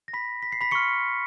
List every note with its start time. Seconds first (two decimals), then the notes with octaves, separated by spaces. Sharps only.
0.08 A#6
0.13 B5 B6
0.42 B6
0.52 C7
0.61 B5 B6
0.71 C6 C#6 F6 C#7